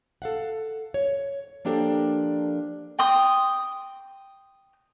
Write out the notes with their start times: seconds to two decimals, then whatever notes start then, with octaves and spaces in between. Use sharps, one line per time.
0.22 A4 F5 F#5
0.94 C#5
1.65 F3 A#3 D4 G4 A4 A#4
2.99 G5 C6 D#6